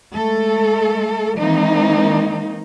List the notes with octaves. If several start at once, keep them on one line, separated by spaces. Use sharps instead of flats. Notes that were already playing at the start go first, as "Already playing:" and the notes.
G#3 A3 A4
D#3 E3 G#3 A#3 C4 D#4